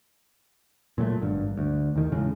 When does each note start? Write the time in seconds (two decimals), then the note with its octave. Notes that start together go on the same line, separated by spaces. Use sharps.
0.98 A#2 F#3 G3 A3
1.21 G#1 G2
1.57 D2
1.96 D#2 D#3
2.11 E2 A2 C#3 G#3